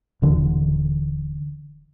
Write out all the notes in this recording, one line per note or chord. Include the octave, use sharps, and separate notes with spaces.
D#1 D3 E3